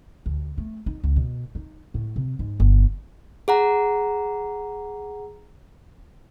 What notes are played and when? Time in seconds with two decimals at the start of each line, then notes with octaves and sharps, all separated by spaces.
0.26 D2
0.58 A3
0.86 D#4
1.03 C#2
1.16 B2
1.55 D#4
1.94 A2
2.16 C3
2.39 G#2
2.60 G1
3.48 G#4 F#5 A#5